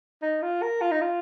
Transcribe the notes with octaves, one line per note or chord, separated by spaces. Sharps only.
D#4
F4
A#4
F4
D#4
F4